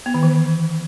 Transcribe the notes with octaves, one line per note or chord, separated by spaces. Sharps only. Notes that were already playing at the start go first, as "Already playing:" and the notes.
B3
D#3
E3